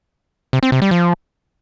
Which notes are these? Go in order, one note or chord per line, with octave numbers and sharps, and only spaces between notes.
C3
C4
C3
G3
F3